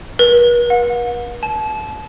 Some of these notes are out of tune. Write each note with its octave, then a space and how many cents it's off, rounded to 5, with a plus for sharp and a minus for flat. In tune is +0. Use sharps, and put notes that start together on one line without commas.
B4 -45
F#5 -45
A5 -30